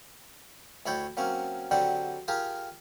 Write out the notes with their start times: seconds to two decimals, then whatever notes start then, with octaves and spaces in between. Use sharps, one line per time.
0.86 D2 E4 C#5 D5 G5
1.17 F#3 A#3 C4 C#4
1.71 D3 F#3 G3 C4 D5 G5
2.28 F4 G4 G#4 A#4